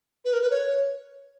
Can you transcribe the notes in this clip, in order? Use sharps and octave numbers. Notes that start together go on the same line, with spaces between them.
B4
A#4
B4
C#5